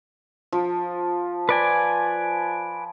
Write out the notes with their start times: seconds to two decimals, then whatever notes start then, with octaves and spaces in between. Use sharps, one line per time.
0.52 F3
1.49 B4 D5 G#5